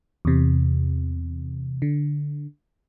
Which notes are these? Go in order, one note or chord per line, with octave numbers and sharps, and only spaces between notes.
E2 C3
D3